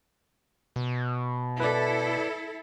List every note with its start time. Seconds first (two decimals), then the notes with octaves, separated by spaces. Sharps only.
0.76 B2
1.60 E4 A4 B4 D5